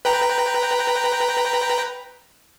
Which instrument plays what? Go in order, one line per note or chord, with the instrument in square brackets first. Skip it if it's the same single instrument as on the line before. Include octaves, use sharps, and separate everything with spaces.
[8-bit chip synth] B4 G5 A#5